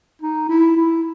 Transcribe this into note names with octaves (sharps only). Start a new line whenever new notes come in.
D#4
E4
E4